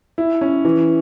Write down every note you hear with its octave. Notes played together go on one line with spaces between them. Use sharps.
E4
C#4
E3